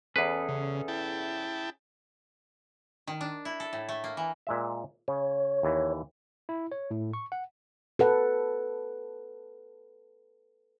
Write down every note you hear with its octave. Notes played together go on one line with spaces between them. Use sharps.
E2 C#4 G#4 A4 B4
C#3
E4 G5 A5
D#3
D4
E4
A4
A2
A3
A#3
E3
A#2 G#3 E5
C#3 C#5
D#2 E3
E4
C#5
A2
C#6
F#5
A4 B4 F#5